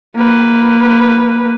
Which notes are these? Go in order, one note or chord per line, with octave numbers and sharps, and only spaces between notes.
A#3 B4